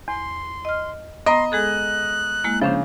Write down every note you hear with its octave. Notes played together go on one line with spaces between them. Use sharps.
E2 C6
D#5 F6
B3 D#5 A#5 C6
G#3 G#4 A4 F#6
G#3 A#3 E4
C#3 F3 C#4 D4 C5